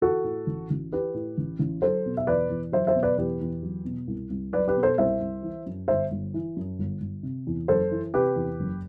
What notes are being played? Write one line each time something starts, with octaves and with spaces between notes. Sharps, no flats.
E3 F#4 A4
A2
A1
A1
E3 G4 B4
A2
A1
A1
F#3 A4 C5
B2
E5
E2 B4 D5
E2
F#3 C5 E5
C5 E5
B2
B4 D5
E2 G4 B4
E2
F#3
B2
C2
C2
F#3 B4 D5
G4 B4
B2
A4 C5
C2 C5 E5
C2
E3
F#2
G1 C5 E5
G1
E3
F#2
G1
G1
C3
E2
F#1 A4 C5
E3
C3 G4 B4
E2
F#1